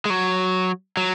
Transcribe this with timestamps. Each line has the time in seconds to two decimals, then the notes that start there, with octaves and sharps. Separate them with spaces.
0.05 G#3
0.10 F#3
0.97 F#3